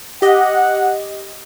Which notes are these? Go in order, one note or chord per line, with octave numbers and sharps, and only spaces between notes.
G4 D#5 F#5